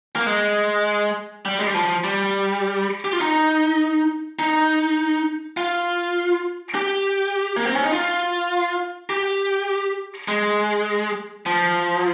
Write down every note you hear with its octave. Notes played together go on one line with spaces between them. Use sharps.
A#3
G#3
G3
G#3
G3
F3
G3
G4
F4
D#4
D#4
F4
G4
A#3
C4
C#4
D#4
F4
G4
G#3
F3